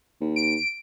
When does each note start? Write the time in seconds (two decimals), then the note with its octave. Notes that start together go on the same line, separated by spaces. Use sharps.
0.21 D#2
0.36 D7